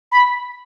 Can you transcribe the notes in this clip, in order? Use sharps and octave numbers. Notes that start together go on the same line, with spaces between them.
B5